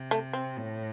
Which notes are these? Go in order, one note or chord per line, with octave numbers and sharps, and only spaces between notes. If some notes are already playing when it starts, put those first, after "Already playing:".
Already playing: C3
A3
C4
A2